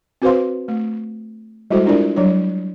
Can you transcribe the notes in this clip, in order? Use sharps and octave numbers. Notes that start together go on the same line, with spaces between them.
C4 F#4 B4 C5 F5 C6
A3
G3 G#3 E4 F#4 A4 C5
G#3 D4 E4 F4 A#4 D5
F#3 G3 D4 C#5